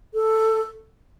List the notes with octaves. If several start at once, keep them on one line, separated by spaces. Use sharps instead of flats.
A4